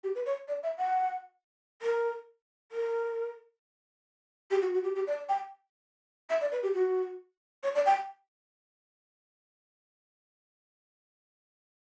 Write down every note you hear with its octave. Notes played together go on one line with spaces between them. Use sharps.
G4
B4
C#5
D5
E5
F#5
A#4
A#4
G4
F#4
F#4
G4
G4
D5
G5
E5
D5
B4
G4
F#4
C#5
D5
G5